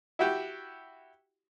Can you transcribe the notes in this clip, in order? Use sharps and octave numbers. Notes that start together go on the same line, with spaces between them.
E4 F#4 G4